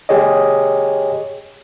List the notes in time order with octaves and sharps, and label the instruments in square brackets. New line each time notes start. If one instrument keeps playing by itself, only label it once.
[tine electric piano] G4 G#4 C#5 D#5